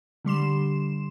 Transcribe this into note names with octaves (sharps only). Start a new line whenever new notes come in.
D3 G3 C6 E7